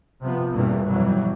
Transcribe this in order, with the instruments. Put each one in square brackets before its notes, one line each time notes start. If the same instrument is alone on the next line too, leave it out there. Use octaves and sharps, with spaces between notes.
[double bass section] C3 F3 B3
E2 G2 B2 E3 A3 A#3
F2 B2 E3 F#3 G3